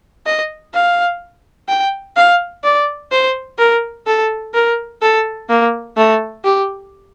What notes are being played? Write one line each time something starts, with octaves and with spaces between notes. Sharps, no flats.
D#5
F5
G5
F5
D5
C5
A#4
A4
A#4
A4
A#3
A3
G4